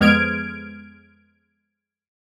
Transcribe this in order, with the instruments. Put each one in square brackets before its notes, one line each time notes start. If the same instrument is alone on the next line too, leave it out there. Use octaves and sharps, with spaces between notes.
[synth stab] F2 G#3 B3 F6 G#6 D7